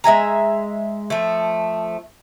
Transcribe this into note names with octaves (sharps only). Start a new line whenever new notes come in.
G#3 E5 G#5 A#5
F3 A3